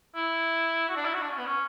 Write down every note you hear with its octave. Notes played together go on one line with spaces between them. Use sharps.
E4
F#4
D4
E4
F#4
D4
C#4
B3
C#4